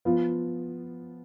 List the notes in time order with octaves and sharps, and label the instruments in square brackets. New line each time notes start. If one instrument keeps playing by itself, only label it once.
[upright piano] F3 B3 F4